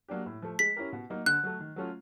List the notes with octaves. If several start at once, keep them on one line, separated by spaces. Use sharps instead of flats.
F#3 A#3 D4 G4
A2
F3 A3
G#3 B6
C#4 E4 G4 A#4
B2
F#3 A#3 D#4
D3 F#6
F#3 A3
D#3
F#3 A3 C#4 F4